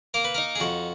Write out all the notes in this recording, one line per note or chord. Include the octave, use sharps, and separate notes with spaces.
A#3 A#4
B4
D#4 A#4
G#4
F2 F#4